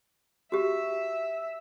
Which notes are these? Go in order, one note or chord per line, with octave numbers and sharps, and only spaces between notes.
F#4 G4 E5